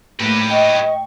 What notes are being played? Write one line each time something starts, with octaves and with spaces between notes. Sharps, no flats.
A2 A#3 G4 B4 A#6
D#5 G5 C#6